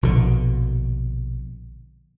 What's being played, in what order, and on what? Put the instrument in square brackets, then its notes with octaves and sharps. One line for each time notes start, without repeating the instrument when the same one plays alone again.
[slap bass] A#1 B2 D3